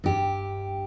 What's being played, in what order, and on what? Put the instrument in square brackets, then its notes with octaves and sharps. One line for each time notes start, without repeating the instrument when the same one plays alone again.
[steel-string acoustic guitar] G2 G4